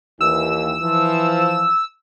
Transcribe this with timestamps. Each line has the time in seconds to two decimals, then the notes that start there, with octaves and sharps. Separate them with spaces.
0.21 D#2 E3 E6
0.83 E3 F3